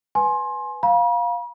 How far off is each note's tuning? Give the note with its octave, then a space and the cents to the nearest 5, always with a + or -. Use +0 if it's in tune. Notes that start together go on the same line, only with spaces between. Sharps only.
B4 +0 G#5 +20 C6 +20
F5 +10 B5 -45